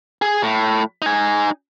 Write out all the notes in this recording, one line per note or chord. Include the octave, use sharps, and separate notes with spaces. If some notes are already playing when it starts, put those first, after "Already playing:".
G#4
A2
D#4 G#5